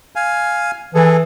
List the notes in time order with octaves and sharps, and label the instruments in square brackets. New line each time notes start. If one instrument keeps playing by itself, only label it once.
[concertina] F5 G#5
[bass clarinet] E3 [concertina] G#4 A4